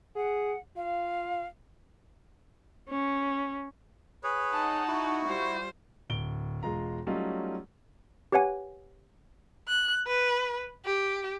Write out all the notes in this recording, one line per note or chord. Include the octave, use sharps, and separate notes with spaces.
G#4 F#5
F4 F5
C#4
G#4 B4 C#5
D#4 F#5 A5
E4 F#4 C#6
G3 F4 C5
D1 D7 G7
E1 G#3 F4 A#5
F#3 G3 A3 C#4 D#4 F4
G4 B4 C#5 F#5 G#5
F#6
B4
G4